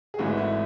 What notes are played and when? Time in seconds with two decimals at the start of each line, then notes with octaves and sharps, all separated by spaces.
0.14 G#4
0.18 G#1 G#2 E3 A3 F#4
0.37 E4